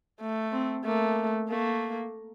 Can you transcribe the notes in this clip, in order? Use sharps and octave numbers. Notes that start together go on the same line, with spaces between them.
A3
C4
A3 A#3
A3 A#3